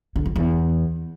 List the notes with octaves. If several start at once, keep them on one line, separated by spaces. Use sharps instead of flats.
D3
F2
E2